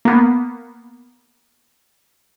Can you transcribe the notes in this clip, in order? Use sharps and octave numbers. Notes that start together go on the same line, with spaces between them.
A#3 B3